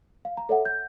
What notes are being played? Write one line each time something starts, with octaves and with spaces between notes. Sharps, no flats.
F5
A#5
A4 C#5 E5 F#5
G6